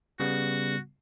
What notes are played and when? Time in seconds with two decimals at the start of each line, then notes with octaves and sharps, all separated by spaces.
0.20 C#3 G3 B3 F#4